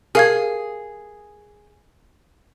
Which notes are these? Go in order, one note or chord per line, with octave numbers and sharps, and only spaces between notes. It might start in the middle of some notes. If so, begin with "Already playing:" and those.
G#4 A#4 F5 G#6